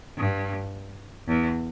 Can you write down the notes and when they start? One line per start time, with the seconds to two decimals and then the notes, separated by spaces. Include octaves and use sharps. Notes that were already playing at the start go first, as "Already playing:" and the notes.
0.17 G2
1.28 E2